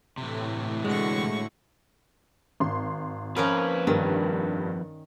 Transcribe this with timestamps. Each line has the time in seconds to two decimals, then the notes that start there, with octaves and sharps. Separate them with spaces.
0.18 A2 C3 E3
0.85 D3 G#3 F#4 C#6
2.60 G#1 C6
3.37 F2 F3 C#4 A#4 B4
3.87 G2 D#3